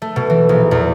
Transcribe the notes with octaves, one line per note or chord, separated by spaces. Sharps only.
A3
B2
E3
A#1
E2